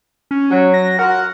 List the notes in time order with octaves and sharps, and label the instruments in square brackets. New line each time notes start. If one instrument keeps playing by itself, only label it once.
[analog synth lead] C#4
[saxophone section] F#3
[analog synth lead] A#6
[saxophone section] F4 F#4 A#4 [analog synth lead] F#5